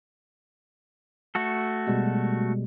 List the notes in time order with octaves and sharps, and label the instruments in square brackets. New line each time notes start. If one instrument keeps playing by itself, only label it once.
[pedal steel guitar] A3 F#4 A4
[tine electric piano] B2 G3 G#3